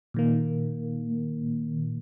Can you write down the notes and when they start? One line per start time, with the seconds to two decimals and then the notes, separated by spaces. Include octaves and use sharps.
0.14 A#2 D#3 A#3